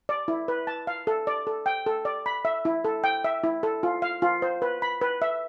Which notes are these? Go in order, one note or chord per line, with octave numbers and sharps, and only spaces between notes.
D5
E4
B4
A5
F5
A4
D5
A4
G5
A4
D5
B5
E5
E4
A4
G5
E5
E4
A4
F4
F5
F4
C5
B4
B5
B4
E5